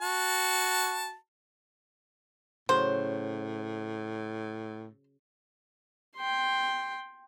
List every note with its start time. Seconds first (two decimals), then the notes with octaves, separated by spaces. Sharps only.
0.01 F#4 A5
2.69 A2 C#3 F#3 F#4 C5
6.16 G5 C6